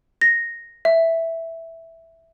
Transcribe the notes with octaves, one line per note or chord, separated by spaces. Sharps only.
A#6
E5